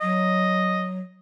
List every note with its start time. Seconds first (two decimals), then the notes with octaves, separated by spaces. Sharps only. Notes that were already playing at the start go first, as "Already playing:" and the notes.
0.01 F#3 D#5